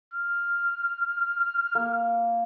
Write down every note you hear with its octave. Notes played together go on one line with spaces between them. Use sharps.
F6
A#3